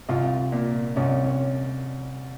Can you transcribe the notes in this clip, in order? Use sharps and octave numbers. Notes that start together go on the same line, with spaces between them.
C2 F4
A#2
C2 C#4
C#4